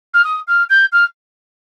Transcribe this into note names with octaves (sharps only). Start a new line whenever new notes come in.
F6
D#6
F6
G6
F6